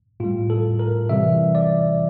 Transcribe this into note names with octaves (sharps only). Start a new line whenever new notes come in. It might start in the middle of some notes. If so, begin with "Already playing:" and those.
A2 G3 F4
A4
A#4
C3 E3 G3 E5
D5